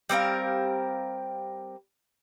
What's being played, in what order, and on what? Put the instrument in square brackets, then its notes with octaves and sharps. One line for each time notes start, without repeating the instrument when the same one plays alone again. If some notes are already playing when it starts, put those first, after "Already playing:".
[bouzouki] G3 C4 A#4 F5